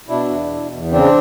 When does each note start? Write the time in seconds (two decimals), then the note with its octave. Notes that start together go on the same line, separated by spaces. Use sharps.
0.09 B2 D4 E4
0.29 E2
0.51 B2
0.71 E2
0.92 C#3 C4 D4